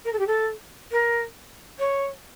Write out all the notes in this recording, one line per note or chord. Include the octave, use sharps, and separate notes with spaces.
A#4
A4
G4
A4
A#4
C#5